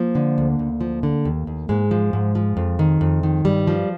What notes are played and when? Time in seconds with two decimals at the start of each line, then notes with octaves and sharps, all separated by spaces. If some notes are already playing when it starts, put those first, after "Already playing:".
Already playing: F3 A#3
0.15 D3
0.38 D2
0.59 D2
0.81 F3
1.03 D3
1.25 D#2
1.47 D#2
1.69 G#2 G#3
1.91 F3
2.13 G#2
2.35 F3
2.57 F2
2.79 D#3
3.01 F2
3.23 D#3
3.45 G2 G3
3.67 F3